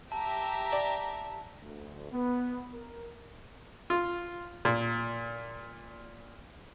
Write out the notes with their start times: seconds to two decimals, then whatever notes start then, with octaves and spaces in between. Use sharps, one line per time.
0.12 G4 E5 A5 A#5
0.73 D5
1.62 D2
2.12 B3
2.73 A#4
3.90 F4
4.65 A#2